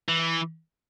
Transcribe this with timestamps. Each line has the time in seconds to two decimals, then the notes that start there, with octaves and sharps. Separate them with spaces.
0.09 E3